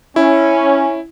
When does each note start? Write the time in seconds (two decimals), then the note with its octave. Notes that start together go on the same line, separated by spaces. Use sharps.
0.16 C#4 E4